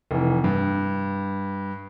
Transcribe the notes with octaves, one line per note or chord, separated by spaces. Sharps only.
F1 E3
G2